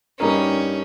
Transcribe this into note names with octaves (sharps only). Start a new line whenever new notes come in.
G2 G3 A#3 C#4 D#4 A#4